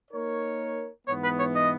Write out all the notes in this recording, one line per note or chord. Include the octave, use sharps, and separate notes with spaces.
A#3 D#4 A#4 C#5
G#2 E3 B3 C#5
B4
C#5
D#5